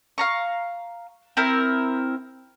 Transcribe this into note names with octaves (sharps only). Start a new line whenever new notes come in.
F5 A#5 C#6
C4 E4 A#4